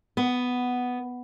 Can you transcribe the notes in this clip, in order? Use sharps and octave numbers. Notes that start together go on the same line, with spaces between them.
B3